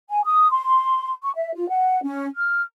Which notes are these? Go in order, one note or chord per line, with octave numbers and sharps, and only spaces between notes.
G#5
D#6
C6
C#6
E5
F4
F#5
C#4
F6